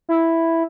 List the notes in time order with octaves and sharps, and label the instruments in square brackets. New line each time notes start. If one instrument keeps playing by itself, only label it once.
[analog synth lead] E4